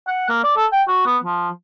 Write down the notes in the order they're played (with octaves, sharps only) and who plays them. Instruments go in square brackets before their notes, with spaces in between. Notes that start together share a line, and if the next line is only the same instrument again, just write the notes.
[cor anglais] F#5
A#3
D5
A4
G5
F#4
B3
F3